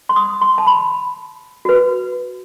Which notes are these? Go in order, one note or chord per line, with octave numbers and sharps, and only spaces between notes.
C6
D#6
C6
A5
B5
F#4 B4